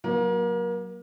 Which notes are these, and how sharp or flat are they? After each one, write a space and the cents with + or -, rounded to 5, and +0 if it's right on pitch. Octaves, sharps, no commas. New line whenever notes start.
F#3 +0 A#3 +30